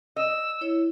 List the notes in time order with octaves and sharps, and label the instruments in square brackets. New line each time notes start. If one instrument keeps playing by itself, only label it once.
[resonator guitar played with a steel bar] D#5 [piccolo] E6
[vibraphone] E4 C#5